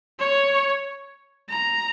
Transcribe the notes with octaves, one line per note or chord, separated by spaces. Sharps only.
C#5
A#5